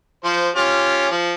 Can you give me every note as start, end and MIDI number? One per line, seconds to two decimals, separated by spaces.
0.25 0.49 53
0.25 0.49 72
0.56 1.08 61
0.56 1.08 65
0.56 1.08 67
1.11 1.34 53